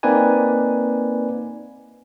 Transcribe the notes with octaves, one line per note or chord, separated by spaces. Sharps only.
A#3 C4 D#4 B4 D5 G#5